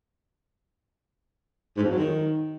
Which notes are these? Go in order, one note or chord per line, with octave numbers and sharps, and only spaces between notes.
G#2
F2
F#3
D#3